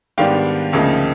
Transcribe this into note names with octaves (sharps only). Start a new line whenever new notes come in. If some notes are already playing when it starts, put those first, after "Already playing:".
G#2 D#3 G3 B3 D4 F5 G5
D2 C#3 F3 A#3 D#4